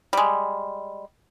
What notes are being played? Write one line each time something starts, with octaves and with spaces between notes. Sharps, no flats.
G3 G#3